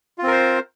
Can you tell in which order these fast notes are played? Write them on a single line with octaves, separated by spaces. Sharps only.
F4 C4 A#4 C5